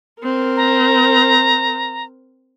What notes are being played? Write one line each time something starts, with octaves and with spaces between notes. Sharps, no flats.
C4 A#4
A#5